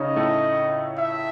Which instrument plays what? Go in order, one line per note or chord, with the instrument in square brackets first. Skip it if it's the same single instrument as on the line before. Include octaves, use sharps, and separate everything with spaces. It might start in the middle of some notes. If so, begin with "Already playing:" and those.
Already playing: [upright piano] C#3 C#4 D#4 [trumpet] D#5
[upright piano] A2 A3
[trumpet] E5